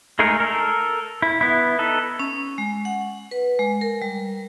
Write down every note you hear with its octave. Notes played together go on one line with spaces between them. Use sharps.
G#3 A3 D#4 G#4 A#4
A4 A#4
E4
B3 E4
D#4 A4 B4
C#4
G#3
F#5
B4
G#3
A#4
G3